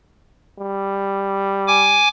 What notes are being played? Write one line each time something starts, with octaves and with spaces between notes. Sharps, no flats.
G3
G#5 D6